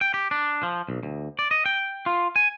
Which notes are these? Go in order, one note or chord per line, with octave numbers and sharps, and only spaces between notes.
G5
G4
D4
F3
B1
D2
D5
D#5
G5
F4
G#5